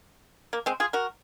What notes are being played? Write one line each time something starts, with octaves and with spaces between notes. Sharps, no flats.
A#3
G#3 C4
F4 G#4
F#4 A#4